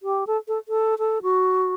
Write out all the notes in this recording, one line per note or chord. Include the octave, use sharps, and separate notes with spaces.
G4
A4
A4
A4
A4
F#4